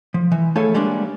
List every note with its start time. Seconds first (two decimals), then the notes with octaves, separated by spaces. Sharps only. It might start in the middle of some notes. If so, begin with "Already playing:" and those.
0.14 F3
0.32 E3
0.56 A3 E4 G#4 A4 C#5 F5
0.74 G3 G#3 A#3 D4